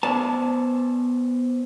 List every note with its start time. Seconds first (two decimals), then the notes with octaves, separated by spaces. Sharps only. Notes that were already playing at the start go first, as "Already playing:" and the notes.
0.03 B3 C5 D5 A5